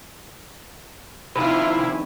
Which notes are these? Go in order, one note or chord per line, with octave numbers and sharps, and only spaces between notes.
F2 C3 D#3 E4 F4 B4 E5